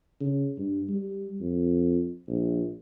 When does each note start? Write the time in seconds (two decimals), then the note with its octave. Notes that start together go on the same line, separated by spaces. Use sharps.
0.21 C#3
0.58 G2
0.89 G3
1.41 F2
2.28 A#1